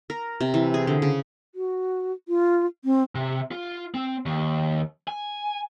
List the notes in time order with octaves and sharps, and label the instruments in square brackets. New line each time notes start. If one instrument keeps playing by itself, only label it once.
[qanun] A#4
C3
E3
G#4
D3
C#3
[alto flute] F#4
F4
C4
[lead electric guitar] C3
F4
C4
D#2
G#5